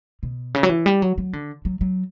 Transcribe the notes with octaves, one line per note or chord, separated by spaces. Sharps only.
B2
C#3
F#3
E3
G3
F#3
F#3
D3
F#3
F#3